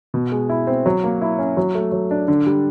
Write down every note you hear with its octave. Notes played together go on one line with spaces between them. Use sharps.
B2
G#3
E4
C4
F#3
A#3
E4
C#4
F#3
A3
F#3
D4
D3
G3